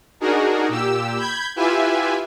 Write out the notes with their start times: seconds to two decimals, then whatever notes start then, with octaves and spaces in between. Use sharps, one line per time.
0.20 D4 D#4 F#4 G#4 A#4
0.69 A#2 G4 E6
1.18 B5 G6 G#6
1.56 E4 F4 G4 B4 E5 G#5